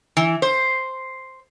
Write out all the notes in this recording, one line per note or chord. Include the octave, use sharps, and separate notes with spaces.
E3
C5